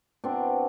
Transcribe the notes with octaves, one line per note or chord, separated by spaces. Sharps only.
B2 C4 D4